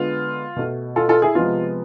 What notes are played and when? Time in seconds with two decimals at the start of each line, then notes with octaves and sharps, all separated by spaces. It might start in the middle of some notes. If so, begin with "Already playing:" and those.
Already playing: D3 G#3 B3 F4
0.56 B2 A3
0.96 F4 A4
1.09 F4 A4
1.22 E4 G#4
1.35 C3 F3 G#3 B3 F4